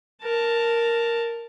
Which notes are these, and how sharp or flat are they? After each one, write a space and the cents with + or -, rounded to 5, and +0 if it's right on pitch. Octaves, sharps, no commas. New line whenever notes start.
A#4 +0 A5 +5